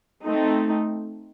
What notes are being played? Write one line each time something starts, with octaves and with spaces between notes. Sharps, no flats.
A3 C4 D#4